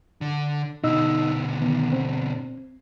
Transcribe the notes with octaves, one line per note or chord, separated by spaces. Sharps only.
D3
B2 D3 D#4 D#5 E6
D#3 B3
C4